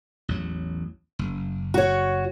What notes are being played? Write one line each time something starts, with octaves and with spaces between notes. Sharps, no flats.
A1 E2 F#3
F#1
F#4 C#5